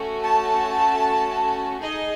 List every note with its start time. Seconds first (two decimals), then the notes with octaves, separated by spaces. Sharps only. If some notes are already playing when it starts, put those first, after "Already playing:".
Already playing: A3 C#4 F#4
0.21 A5
1.80 D#4 G#4 D#5